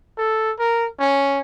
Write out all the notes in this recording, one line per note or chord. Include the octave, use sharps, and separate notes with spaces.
A4
A#4
C#4